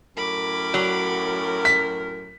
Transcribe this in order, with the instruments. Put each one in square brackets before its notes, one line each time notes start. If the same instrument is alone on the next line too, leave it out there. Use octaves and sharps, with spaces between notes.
[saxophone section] F#2 A2 A#4 [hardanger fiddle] B5 D6
[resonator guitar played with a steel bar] F#3
[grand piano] B6